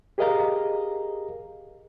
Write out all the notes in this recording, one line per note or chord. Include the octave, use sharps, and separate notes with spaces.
G4 G#4 A#4 D#5 F5 A#5